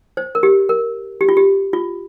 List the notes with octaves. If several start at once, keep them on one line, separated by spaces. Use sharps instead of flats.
C5
A#4
G4
A#4
G4
F4
G4
F4